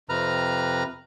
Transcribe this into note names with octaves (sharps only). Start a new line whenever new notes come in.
F2 C3 B4 A#5 F6